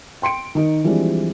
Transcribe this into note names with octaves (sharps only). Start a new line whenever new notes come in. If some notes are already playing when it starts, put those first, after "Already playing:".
G5 C6 C#7 D7
D#3 D#4 A#4
E3 F3 G3 G#3 C4 D4